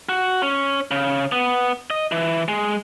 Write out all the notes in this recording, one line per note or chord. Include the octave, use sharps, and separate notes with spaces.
F#4
C#4
C#3
B3
D#5
E3
G#3